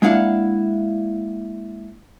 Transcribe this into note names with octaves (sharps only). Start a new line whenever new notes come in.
G#3 A#3 D4 E4 F5 F#5